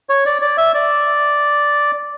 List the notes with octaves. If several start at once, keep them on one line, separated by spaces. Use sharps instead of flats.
C#5
D5
D5
E5
D5